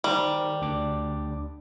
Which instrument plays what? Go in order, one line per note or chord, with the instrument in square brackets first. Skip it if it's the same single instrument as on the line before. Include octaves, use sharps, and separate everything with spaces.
[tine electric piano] D#3 A#4 C5 [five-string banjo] G3
[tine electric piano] D2 D4 D6